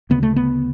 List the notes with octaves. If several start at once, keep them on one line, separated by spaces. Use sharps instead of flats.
D2 C#3 B3
A3
B3